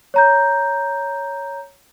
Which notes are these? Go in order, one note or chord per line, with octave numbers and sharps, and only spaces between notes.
C#5 A#5 G6